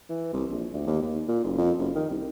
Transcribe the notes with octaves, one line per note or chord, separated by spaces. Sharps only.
E3
C2
A#1
D2
D#2
D#2
A#2
F#1
F2
F#1
D#3
C2